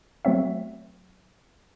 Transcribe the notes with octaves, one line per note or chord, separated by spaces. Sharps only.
F#3 A3 B3 C4 C#5 E5